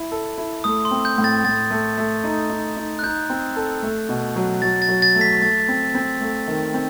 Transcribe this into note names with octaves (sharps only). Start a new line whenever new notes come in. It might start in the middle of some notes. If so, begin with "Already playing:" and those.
Already playing: E4
A4
E4
A3 D#6
C6
C4
G6
A2
A6
A2 A6
A3
A3
D#4
D#4
D#4
F#6
D#4 G6
C4
A4
A3
B2
F#3
F#3 A6
A6
F#3
A6
A3
B6
A3 A6
C4
C4
A3
D#3
C4